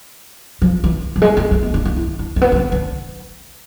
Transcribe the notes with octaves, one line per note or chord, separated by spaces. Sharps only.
F3
E3
F3
G#3
A3
A3
B3
D4
D4
E4
D4
A3
B3
B3
C4
D4